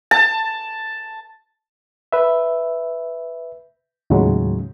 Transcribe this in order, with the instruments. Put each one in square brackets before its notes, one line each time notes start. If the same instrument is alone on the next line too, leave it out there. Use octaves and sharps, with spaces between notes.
[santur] A5
[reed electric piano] B4 E5
D#2 A2 C#3 F#3 G#3